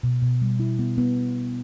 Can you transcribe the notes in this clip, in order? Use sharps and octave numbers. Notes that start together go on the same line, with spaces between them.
B2
B2
G3
E4
B3
B3